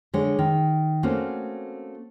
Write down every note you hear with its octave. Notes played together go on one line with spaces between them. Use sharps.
D3 G#3 C#5
D#3
A3 A#3 C4 C#4 F#4